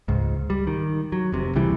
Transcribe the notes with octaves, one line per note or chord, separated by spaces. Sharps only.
C#2 G#2
G3
D#3
F#3
F1 C3
C#2 C3 E3 G3